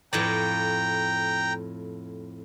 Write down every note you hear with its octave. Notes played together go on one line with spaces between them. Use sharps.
F2 A2 D5 G5 A#5